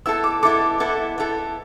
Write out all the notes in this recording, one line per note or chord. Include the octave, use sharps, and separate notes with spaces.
B3 E4 A4 E6
D6
B3 E4 A4 D6
B3 E4 A4
B3 E4 A4